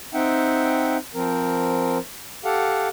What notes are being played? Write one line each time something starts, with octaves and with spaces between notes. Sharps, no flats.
C4 D#4 E5 F#5 G5
F3 C4 A#4
G4 A4 F5 F#5